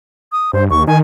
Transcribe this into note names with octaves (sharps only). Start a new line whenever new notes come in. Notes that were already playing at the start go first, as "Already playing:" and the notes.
D#6
G2 C5
D#2 C#6
D#3 G#5